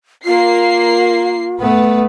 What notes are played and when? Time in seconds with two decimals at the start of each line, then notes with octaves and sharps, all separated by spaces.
0.25 A#3 F4 C7
1.60 A3 B3 B4